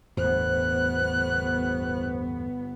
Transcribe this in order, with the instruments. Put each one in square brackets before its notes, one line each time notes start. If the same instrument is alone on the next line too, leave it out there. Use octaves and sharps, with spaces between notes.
[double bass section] G1 B3 [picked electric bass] E2 A2 [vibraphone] C5 [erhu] F#6